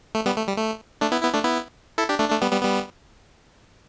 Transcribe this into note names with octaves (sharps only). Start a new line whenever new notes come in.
A3
G3 B3
A3
G3
A3
A3 D4
B3 E4
B3 E4
A3 D4
B3 E4
E4 A4
D4 G4
A3 D4
A3 D4
G3 B3
G3 B3
G3 B3